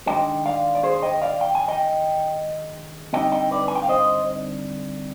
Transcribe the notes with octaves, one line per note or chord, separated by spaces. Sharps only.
D#3 G#3 D4 D#5 G5
D5 F5
D5
G#4 C5
D#5 G5
D5 F5
G5
G#5
D#5 G5
D3 G3 C4 D#4 D#5 G5
D#5 G5
B4 D5
G#5
G5
F5
C5 D#5